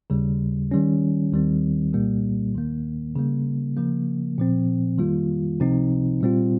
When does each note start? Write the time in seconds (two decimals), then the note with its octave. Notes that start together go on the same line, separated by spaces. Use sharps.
0.10 D#2 C#3 G3
0.71 D#3 G3 C#4
1.32 D#2 D#3 G3 C4
1.93 C2 A#2 G3 A#3
2.54 D#2 D#3 A#3
3.16 C#3 G3 A#3
3.77 C#3 F3 A#3
4.38 A#2 F3 C4
4.98 F2 D#3 G3 A#3 F4
5.59 C#2 C3 F3 C4 D#4
6.21 A#2 G3 C4 F4